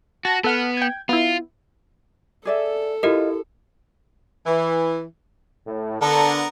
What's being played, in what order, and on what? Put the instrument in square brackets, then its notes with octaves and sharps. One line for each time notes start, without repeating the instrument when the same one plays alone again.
[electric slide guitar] F#4 [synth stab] A5 A#6
[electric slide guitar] B3 [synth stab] A4 F#5 F6
[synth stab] G5 G#6
[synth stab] B3 E4 [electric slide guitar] F4
[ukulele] G#4 D5 E5 [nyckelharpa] A4
[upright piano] E4 [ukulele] F4 D#5 [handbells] G4 A#4
[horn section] E3
[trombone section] A2
[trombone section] D3 [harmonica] B3 A#4 A#5 [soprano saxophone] A4